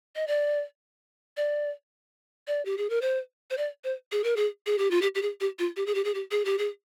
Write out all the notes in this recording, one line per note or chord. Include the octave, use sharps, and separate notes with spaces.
D#5
D5
D5
D5
G4
G#4
A#4
C5
C5
D5
C5
G#4
A#4
G#4
G#4
G4
F4
G4
G4
G#4
G4
F4
G4
G#4
G4
G#4
G4
G#4
G4
G#4